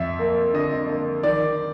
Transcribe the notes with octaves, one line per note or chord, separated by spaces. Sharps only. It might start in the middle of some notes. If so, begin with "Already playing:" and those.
Already playing: F2 E5
A#3
D3 D#5
A#3
D#3 D5